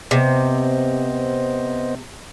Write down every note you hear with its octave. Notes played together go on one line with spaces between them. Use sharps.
C3 B3 C5 D#5